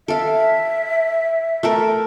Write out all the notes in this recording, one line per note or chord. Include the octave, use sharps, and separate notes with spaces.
A4 E5 F5
A3 A4 A#4